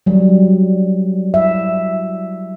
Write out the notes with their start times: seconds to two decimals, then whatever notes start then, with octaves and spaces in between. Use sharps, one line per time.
0.06 F#3 G3
1.34 E5